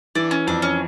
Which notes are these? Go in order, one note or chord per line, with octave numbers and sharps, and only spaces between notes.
E3 D4
C#4
F2 D4
C#4